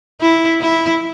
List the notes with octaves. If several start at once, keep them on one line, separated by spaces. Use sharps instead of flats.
E4
E4